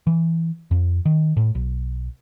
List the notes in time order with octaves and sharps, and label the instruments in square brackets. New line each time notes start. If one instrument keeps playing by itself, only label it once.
[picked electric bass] E3
F2
D#3
A2
B1